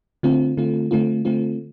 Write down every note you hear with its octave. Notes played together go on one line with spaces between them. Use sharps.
D3 A3 C4 F4
D3 A3 C4 F4
D3 A3 C4 F4
D3 A3 C4 F4